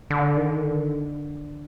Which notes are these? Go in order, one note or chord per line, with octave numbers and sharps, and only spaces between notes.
D3
D#3
D3